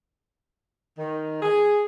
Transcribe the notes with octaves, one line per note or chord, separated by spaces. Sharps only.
D#3
G#4